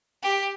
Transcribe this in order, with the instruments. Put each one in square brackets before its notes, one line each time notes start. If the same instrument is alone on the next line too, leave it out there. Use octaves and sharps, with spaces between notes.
[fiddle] G4